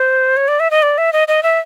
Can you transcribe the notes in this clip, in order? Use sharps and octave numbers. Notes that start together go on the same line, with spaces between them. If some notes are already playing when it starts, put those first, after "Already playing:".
Already playing: C5
C#5
D5
E5
D#5
D5
E5
D#5
D#5
E5